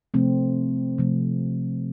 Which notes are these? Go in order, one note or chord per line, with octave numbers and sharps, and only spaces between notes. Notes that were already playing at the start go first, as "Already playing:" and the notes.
C3 F3 A3 C4
C3 F3 A3